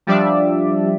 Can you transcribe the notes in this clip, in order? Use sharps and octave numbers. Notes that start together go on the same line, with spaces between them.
F3 G3 D4 D5 E5